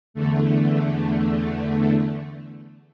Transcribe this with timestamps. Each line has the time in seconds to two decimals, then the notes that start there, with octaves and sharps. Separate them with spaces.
0.14 E2 D3 A3